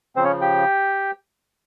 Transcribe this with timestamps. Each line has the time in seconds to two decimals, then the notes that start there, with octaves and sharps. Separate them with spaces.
0.16 C#3 F3 C4 C5
0.24 C#4 C#5
0.41 G4 G5